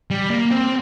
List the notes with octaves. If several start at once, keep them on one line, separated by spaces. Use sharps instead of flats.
G3
A#3
C4